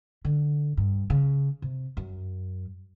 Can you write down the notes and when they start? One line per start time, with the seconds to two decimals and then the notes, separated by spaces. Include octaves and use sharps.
0.25 D3
0.77 G2
1.10 C#3
1.62 C3
1.97 F#2